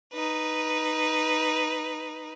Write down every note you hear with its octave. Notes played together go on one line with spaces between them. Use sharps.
D#4 B4